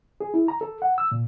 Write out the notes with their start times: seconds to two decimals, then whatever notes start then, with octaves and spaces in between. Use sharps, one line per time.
0.21 G#4
0.34 E4
0.48 A#5
0.61 A4
0.82 F#5
0.98 E6
1.12 A#2